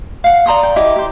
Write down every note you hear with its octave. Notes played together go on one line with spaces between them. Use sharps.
F5 F#5
D5 A#5 C6 D#6
G5
E4 G4 D#5 D6
G4 C5